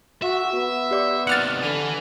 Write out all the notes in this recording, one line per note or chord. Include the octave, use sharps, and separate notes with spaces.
F#4 E5
B3
G4 D5 D6
D#2 C3 F#5 F6 A6
D3 B4 G#5 F7